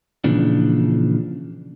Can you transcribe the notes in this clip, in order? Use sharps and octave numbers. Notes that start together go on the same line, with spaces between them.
A#2 C#3 E3 F3 D4